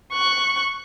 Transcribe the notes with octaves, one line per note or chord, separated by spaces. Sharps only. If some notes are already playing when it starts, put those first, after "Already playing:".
C#6 F#6